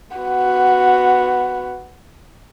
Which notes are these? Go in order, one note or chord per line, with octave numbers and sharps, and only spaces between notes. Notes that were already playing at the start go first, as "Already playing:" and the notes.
B3 F#4